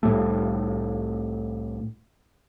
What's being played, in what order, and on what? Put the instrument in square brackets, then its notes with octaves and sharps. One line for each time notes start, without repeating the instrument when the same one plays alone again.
[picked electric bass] C2 A2 G3 A3